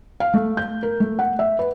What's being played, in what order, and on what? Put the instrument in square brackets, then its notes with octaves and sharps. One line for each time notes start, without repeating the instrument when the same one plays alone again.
[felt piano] F5
A3
G6
A#4
A3
F#5
E5
B4